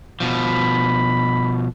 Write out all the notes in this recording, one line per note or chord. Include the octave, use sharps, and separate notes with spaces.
B2 F3 B5